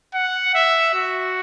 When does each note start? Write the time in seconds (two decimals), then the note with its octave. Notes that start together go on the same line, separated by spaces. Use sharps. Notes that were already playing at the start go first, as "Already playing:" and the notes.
0.14 F#5
0.54 E5
0.94 F#4